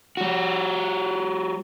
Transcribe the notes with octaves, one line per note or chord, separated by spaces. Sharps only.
G3 F#4